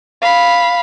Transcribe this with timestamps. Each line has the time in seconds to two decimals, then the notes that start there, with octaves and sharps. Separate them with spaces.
0.22 F5 B5